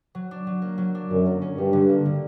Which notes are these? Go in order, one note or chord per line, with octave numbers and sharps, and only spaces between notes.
F#3
D4
F#3
A#3
F#3
D4
F#2 D3
A#3
C#4
G2 G3
D3
A#3
D3